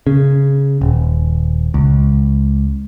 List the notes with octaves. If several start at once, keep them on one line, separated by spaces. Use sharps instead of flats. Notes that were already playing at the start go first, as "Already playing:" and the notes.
C#3
D#1
C#2